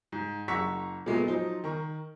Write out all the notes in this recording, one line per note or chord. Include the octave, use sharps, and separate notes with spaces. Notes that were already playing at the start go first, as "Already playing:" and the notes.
G#2
F#1 F#5 A#5 C#6 E6 B6
A#2 G#3 A3 B3
F3 F#3 D#4 C5
D#3 A#4 C#6